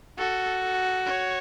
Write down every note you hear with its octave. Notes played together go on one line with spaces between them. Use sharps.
F#4 A4
A4
C#5